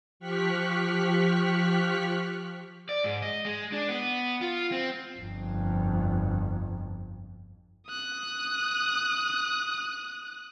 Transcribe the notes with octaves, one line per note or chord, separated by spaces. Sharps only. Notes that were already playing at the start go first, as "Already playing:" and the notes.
F3 G4 C#6 F6 F#6 B6
D5
G#2
D#5
G#3
D4
B3
F4
C4
G1 F2
D#6 F#6